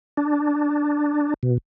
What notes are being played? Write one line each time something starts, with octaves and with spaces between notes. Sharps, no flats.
D4
B2